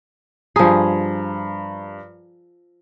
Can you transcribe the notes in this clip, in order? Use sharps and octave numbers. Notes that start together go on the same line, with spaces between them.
G2 F3 G#4 A#5